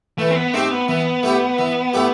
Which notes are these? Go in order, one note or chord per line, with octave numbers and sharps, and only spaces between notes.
E3 A3
C4
B3
A3 C4 D#4 G4
B3
E3 B3
A3 E4 G4
E3
A3 E4 G4